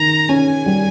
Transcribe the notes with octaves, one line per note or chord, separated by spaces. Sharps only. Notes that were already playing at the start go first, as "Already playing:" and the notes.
Already playing: D#3 A#5
C#4 G#5
G3